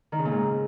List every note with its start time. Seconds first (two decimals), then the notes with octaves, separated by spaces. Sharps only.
0.12 D#3
0.19 C#3
0.25 A#2
0.32 G#2